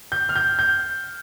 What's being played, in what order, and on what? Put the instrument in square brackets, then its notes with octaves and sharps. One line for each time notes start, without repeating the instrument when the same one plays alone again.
[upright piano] G6
F6
G6
G6